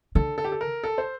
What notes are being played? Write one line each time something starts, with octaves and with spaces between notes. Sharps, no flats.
D3 A4
A4
G4
A4
A#4
A4
C5